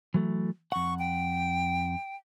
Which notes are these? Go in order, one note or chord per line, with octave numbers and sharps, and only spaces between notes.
E3 F#3 A3
F2 F#5 C#6
G5